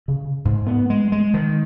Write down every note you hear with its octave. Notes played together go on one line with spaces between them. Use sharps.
C#3
G#2
B3
G#3
G#3
D#3